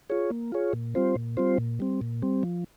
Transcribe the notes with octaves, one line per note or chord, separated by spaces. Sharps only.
F4 G#4 C#5
A#3
F4 G#4 C#5
A#2
G3 C4 F4 C5
A#2
G3 C4 F4 C5
A#2
G3 C4
A#2
G3 C4
F3